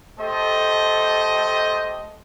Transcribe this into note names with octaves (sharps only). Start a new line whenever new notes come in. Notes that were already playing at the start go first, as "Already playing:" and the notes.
A3 G4 A4 C5 D#5